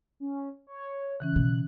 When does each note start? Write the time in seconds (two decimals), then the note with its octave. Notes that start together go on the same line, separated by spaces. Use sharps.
0.20 C#4
0.67 C#5
1.20 C#3 E3 C#4 F#6
1.36 B2